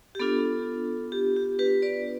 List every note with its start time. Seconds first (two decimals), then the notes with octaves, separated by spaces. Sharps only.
0.15 G4
0.20 B3 D4 F4 A4
1.12 G4
1.36 G4
1.59 G4 B4
1.82 B4 D5